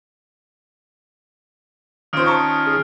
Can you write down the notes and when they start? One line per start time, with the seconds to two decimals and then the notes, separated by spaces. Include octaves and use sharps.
2.13 D#3 F3 C#4 F4 C5 D#6 F6 D7
2.26 A5 A#5 C#6
2.66 G#4